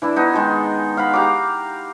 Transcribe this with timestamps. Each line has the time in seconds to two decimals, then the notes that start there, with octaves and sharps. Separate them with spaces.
0.02 E3 D4 E4
0.16 B3 D#4 A5
0.33 D#3 G#3 G#4 A5
0.97 F5 F#5 B5
1.13 G4 F5 A#5 D6